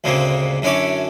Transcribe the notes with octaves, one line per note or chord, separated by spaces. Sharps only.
D2 A#2 C#3 G#3 A#3 C4
F#2 D3 C#4 E4 C#5 D6